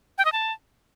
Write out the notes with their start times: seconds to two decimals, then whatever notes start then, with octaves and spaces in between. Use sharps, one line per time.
0.18 G5
0.25 D#5
0.32 A5